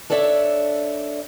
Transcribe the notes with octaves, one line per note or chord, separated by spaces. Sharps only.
D4 A4 C#5 D5 E5